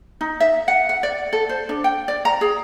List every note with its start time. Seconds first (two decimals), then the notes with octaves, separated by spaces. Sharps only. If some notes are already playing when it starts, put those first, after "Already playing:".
0.21 D#4
0.40 E5
0.68 F#5
0.89 F#5
1.03 D5
1.33 A4
1.49 C5
1.69 D4
1.84 G5
2.08 D5
2.25 A#5
2.41 G#4